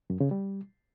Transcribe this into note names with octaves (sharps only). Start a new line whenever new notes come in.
F#2
C#3
G3